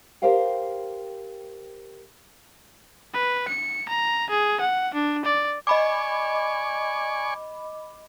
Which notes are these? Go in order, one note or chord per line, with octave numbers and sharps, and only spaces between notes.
G4 A#4 C5 F5 G5
B4
C#7
A#5
G#4
F#5
D4
D5
D5 D#5 G#5 B5 C#6 D6